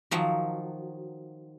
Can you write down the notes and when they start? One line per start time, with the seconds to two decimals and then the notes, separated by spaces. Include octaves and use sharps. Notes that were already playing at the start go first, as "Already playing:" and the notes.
0.11 D#3 F3 F#3